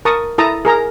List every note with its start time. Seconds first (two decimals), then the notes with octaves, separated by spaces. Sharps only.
0.05 A#4 A5 C#6 D#6
0.38 E4 A4 A5 A#5 D#6
0.65 G#4 A#4 A#5